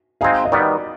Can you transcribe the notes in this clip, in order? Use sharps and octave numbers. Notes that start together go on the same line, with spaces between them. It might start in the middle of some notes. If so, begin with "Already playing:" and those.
G#3 C4 D#4 G#4 F5
D#5
D#3 G3 B3 D5